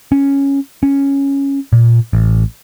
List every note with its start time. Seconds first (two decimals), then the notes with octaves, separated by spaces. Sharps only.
0.12 C#4
0.83 C#4
1.73 A#2
2.13 A1